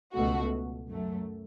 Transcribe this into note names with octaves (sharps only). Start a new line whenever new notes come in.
C#2 B2 A3 F#4
F#2 F#3 A3